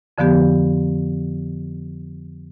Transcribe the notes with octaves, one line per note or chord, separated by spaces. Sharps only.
F2 D3 F3 B3 G4